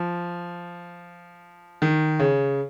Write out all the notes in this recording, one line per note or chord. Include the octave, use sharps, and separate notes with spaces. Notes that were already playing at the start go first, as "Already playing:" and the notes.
Already playing: F3
D#3
C#3